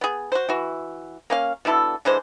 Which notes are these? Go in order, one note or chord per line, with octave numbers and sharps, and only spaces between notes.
B3 G#4
F#4 C5
E3 F#4
A#3 C#4 F5
B2 D3 E4 A4
D3 E3 G#3 C5